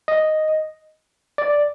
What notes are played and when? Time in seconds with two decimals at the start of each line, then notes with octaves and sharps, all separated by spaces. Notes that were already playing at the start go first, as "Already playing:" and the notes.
0.08 D#5
1.38 D5